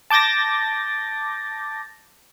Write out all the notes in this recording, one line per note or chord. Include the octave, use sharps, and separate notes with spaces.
A5 D6 G6 A6 A#6